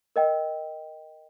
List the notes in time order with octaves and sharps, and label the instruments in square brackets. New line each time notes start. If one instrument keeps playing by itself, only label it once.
[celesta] A#4 D#5 G5